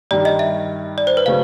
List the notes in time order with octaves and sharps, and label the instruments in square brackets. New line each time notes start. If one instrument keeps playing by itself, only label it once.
[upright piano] G2 D#3 G3 [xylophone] D5
[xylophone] D#5
E5
D5
C5
B4
[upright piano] C#3 F#3 A3 C#4 [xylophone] F5